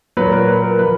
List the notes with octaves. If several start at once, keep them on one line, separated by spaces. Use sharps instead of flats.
A#2 F#3 B4
A#4
B4
A#4
F3 B4